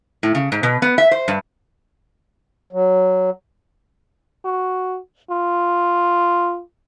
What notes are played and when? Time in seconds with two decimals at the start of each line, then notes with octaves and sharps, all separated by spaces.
0.23 A2
0.35 C#3
0.52 G#2
0.63 B2
0.82 B3
0.98 E5
1.11 C5
1.28 G2
2.73 F#3
4.45 F#4
5.30 F4